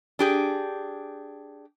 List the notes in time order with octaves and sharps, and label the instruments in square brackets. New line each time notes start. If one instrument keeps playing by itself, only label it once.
[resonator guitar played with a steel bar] D4 G4 G#4